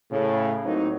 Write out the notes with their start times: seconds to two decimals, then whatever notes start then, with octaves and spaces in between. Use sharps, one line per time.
0.11 A2 C#3
0.63 A2 F#3 A#3 C4 D#4